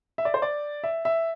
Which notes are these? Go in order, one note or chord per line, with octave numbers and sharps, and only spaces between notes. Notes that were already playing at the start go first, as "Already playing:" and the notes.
E5
D5
C5
D5
E5
E5